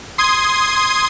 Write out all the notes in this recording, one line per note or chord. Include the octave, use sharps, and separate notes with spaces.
C6 D#6 G#6